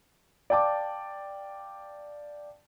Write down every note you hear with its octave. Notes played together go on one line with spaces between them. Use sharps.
D5 F5 G5 A5 D6